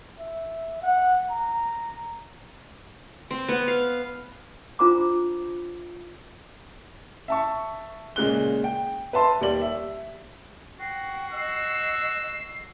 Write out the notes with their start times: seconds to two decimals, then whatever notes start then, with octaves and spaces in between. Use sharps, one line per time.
0.19 E5
0.83 F#5
1.31 A#5
3.31 C4
3.49 B3
3.68 F5
4.79 D4 F4 C5 A#5 B5 D6
7.28 E5 A5 C#6
8.16 A#2 C#3 G#3 F#6 G7
8.64 G5
9.13 B4 E5 A5 C6
9.41 D#2 G3 D5 F#7
9.61 E5
10.80 F#4 G5 C7
11.32 D#5 E6